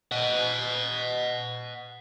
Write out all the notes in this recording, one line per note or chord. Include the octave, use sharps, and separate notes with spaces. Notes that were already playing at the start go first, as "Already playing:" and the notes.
D#5 F#5